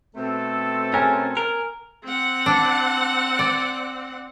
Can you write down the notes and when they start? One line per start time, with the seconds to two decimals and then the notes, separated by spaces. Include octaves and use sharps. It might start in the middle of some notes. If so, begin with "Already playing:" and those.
0.16 B2 A3 C4 A4
0.94 C#4 A#4 G#5
1.37 A#4
2.04 C4 F#5
2.46 D4
3.39 D5